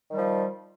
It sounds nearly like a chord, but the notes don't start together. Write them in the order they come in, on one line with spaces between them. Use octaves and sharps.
D#3 G3 F3